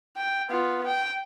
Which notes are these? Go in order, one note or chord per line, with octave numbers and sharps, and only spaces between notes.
G5
B3 F4
G5